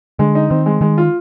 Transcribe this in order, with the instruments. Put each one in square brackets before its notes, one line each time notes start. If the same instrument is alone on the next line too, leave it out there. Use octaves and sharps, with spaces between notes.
[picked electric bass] D3 [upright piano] G#3
[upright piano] D#4
[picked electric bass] D#3 [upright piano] C4
[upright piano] G#3
[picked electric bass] D#3 [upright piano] G#3
[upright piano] F4